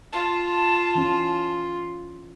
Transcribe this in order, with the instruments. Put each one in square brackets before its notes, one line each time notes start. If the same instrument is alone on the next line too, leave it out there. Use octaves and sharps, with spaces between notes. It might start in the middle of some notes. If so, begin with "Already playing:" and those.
[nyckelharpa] F4 [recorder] A5
[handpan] E3 C#4